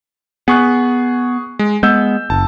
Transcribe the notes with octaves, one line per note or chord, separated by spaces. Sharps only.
B3 G#4 C#6 F#6
G#3
G#3 B3 E6 G6
F#1 A5